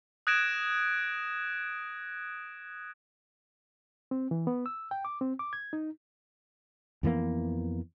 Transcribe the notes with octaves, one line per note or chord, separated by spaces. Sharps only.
D#6 F#6 G#6 A#6 D7 E7
C4
E3
B3
E6
G5
D6
C4
D6
G#6
D#4
F2 E3 A#3 B3